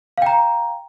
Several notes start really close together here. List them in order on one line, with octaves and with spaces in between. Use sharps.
F5 G5 A#5